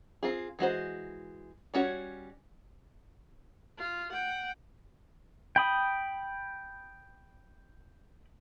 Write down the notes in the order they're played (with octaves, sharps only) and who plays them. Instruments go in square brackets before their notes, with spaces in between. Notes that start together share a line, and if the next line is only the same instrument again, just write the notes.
[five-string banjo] C4 F4 G#4
E3 G#3 F#4 C5
G3 C#4 F#4 C5 C#5
[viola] F4
F#5 G5
[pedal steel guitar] G5 B5 D#6